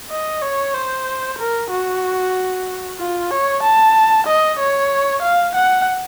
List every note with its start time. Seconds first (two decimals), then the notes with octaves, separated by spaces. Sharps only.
0.10 D#5
0.42 C#5
0.74 C5
1.38 A#4
1.70 F#4
2.99 F4
3.31 C#5
3.63 A5
4.26 D#5
4.59 C#5
5.22 F5
5.55 F#5